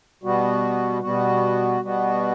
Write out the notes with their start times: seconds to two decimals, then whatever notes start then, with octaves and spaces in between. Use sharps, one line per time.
0.23 B2 G3 B3 F#4
1.02 B2 G3 B3 F#4
1.80 B2 G3 B3 F#4